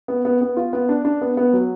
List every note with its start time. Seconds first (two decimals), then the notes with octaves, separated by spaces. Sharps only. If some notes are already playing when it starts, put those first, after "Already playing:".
0.08 B3
0.25 B3
0.41 B3
0.57 F4
0.73 B3
0.89 D4
1.05 D4
1.21 B3
1.37 B3
1.53 F#3